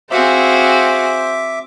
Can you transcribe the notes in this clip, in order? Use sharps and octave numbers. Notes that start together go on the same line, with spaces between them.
C4 F#4 G#4 C5 E5 F5 D6